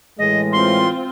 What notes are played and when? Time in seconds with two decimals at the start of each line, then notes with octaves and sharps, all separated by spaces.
0.19 A2 E3 G#3 D#5
0.53 C4 F4 C6